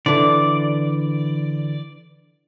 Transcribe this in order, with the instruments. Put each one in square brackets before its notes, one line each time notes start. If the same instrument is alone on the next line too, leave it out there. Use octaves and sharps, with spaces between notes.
[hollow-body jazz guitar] D3 E3 [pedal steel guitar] D5